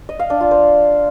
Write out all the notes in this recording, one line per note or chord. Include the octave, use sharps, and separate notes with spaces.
D#5
F5
D4
F4
C5